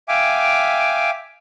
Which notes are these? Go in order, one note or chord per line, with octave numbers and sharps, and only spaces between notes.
E5 F5 G5 G#5 D6